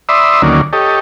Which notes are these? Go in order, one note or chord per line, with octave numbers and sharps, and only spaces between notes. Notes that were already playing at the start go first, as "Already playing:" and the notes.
D5 E5 B5 C6 D#6 E6
D2 D#3 F#3 A#3 C#4 D5
G4 A4 C#5 D#5